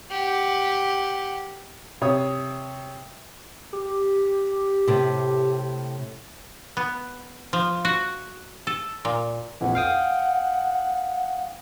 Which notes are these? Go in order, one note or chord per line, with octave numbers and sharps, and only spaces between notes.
G4 F#5
C3 C#5 D#6
G4
A2 C3
B3
F3
F#4
A4
A#2
A#1 F2 E3 F#5
F5 G5 D#6